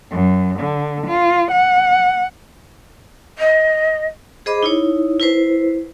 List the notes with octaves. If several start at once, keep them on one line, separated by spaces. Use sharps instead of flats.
F#2
D3
F4
F#5
D#5
G#4 C5 D#5 B5 D6
D#4 E4 C#5
E4 B4 C5